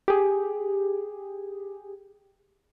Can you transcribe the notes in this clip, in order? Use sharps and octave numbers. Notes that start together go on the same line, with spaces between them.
G4 G#4